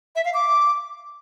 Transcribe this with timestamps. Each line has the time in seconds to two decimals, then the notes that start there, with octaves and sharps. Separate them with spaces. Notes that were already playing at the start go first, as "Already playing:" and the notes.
0.16 E5
0.25 F5
0.34 D6